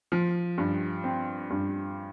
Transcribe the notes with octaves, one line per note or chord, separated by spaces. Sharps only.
F3
G2
C4
G2